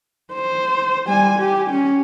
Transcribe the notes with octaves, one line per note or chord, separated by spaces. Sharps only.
C5
G3 G#5
G4
C#4